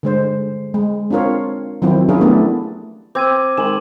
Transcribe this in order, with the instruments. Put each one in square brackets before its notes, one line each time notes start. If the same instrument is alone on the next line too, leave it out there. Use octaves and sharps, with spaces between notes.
[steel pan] D3 G#3 C5
G#3
C4 D4 F4 A#4 C#5
D#3 F3 F#3 C4 E4
C#4 D4 E4 F4 G#4 A#4
A3 B3 D4 E4 G4
[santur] C4 [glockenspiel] D6 G#6 D#7
[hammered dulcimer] D#3 G#3 G#5 [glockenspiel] E7 F#7